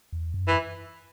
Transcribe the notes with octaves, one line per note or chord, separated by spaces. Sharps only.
E2
F#2
E3